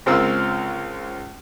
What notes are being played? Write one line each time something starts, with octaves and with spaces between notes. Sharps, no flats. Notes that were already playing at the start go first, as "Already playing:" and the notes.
C#2 G#3 C4 F4 A#4 E6